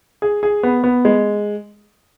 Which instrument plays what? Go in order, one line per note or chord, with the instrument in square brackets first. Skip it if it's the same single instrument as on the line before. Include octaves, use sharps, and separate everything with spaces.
[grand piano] G#4
G#4
B3
B3
G#3